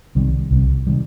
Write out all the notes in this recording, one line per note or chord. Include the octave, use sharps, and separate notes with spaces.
C2 C3 D#3 G3
C2 C3 D#3 G3
C3 D#3 G3